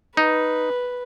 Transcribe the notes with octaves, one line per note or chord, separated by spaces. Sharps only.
D#4 B4